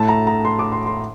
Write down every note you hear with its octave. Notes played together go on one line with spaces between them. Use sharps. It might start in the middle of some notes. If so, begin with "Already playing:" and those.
Already playing: A2 A3 A5
A#5
A#5
C6
D6
C6
C6